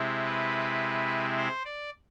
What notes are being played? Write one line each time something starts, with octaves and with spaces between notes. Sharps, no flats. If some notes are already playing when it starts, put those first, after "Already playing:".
Already playing: C3 G#3 C4 E4
B4
C5
D5